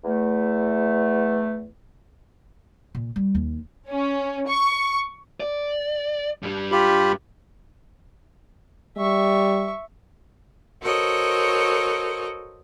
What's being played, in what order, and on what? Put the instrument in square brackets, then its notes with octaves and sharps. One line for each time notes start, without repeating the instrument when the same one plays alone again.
[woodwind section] E2 A3
[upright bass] A#2
G3
D#2
[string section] C#4
C#6
[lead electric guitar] D5
G2 G3
[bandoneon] F4 G4 B5
[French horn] G3 [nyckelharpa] E5 C#6
[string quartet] F#4 A4 A#4 C5 C#5 D#5